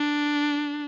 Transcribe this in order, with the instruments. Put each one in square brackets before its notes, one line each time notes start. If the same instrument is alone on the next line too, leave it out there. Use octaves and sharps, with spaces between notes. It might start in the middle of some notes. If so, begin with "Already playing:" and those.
Already playing: [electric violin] D4